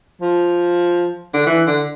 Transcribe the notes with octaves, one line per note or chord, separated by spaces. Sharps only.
F3
D3
E3
D3